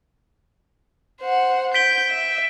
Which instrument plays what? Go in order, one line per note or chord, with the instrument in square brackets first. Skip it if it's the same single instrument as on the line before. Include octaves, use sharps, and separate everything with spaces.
[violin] C5 F#5
[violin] G6 [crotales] B6 D7 G7
[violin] E5